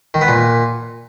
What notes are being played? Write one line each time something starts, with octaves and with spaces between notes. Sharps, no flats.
D#3
B3
A#2